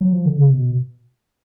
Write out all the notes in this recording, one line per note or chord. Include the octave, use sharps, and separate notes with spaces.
F#3
F3
D3
C#3
B2